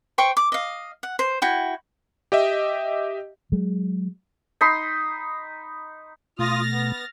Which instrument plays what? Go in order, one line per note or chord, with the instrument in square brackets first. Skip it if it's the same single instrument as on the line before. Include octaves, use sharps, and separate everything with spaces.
[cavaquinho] C5 G5 C#6
D6
D#5 F5
F#5
C5
E4 F#4 G5
[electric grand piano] G4 D#5 E5
[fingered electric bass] F#3 G#3
[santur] D#4 B5 C6
[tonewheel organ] B2 A3 [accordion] F4 D#6 [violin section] F6 A6 A#6
[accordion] B3